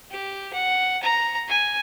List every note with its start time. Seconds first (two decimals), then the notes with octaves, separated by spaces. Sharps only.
0.11 G4
0.53 F#5
1.03 A#5
1.48 G#5